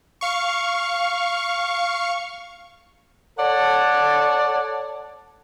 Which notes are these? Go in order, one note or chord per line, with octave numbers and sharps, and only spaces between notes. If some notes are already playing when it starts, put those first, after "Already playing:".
F5 C#6
A4 C#5 D5 F#5 A5